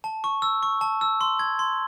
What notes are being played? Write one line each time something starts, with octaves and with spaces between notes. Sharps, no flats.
A5
C#6
E6
C#6
A5
E6
C6
G#6
C6